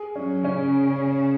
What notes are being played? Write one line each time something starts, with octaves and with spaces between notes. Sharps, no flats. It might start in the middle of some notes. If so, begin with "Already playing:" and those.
Already playing: G#4
F#3 C#4
C#3 C#4